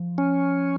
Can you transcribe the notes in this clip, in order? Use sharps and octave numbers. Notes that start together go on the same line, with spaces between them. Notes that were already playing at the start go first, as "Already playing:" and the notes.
Already playing: F3
C#4